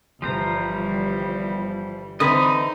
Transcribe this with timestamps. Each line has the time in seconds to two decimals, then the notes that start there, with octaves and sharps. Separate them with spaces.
0.22 G1 E3 F3 G3 C5 A#5
2.20 D3 E3 C4 D#4 B4 D#5 D#6